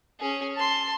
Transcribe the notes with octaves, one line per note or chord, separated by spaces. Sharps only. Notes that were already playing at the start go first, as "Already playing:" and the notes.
C#4 G#4
A5 C6